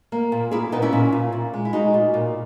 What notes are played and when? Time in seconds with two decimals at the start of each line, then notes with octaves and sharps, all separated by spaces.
0.12 A#3
0.32 A#2
0.51 A#3 E4 G#4
0.72 A#2 B3 D#4
0.82 C#4 E4
0.93 A#2
1.12 A#2
1.32 A#2
1.54 G#3
1.65 E4
1.73 G#3 D#4 F#4
1.94 A#2
2.14 A#2